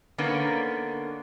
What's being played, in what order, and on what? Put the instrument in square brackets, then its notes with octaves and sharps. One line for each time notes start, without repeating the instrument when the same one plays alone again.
[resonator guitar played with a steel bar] D3 A#3 B3 C#4 D#4